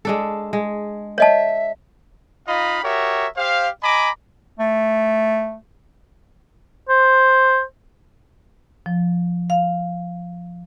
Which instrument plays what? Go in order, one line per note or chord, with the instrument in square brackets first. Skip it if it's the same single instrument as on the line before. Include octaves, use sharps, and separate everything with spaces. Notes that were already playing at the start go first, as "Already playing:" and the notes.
[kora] G#3 D4 A4
G#3
[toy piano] C#5 D#5 A5 [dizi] E5
[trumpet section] D#4 F4 D#5 F5 B5
F#4 G4 A#4 C#5 E5
G4 C5 F5
D#5 G#5 A#5 B5 D6
[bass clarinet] A3
[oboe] C5
[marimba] F3
F5